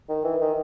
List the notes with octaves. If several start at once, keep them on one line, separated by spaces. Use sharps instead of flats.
D#3
E3
D#3